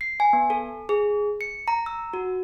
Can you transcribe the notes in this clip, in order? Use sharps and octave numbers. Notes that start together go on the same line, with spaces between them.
C7
G#5
B3
A4
G#4
C#7
A#5
E6
F#4